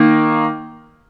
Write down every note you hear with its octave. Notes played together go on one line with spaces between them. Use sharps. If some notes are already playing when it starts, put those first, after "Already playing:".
Already playing: D#3 A#3